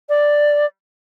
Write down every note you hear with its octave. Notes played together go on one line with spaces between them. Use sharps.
D5